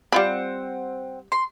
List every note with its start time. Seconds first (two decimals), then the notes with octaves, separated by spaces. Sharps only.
0.12 G3 C4 F4 F#5 B5
1.32 C6